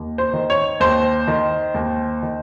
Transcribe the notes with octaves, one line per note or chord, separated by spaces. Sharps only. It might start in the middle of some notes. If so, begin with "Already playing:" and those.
Already playing: D#2
C5
D#3
C#5
D#2 C5
D#3
D#2
D#3